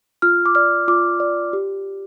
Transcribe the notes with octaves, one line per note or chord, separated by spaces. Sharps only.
F4 F6
D6
D5 F6
F4 D6
D5
G4